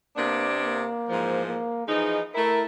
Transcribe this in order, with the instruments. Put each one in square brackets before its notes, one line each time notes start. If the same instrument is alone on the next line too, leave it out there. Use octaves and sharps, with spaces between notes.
[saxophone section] C3 B3 D4 [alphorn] A#3
[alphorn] A#3
[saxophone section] G#2 E3 F3
[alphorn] A#3
[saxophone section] E3 F3 D#4 [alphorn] G#4
[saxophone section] A3 E4 [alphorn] A#4